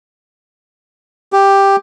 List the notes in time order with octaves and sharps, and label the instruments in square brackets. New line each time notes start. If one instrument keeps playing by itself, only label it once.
[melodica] G4